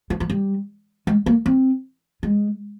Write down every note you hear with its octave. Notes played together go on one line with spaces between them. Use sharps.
F3
F3
G3
G#3
A#3
C4
G#3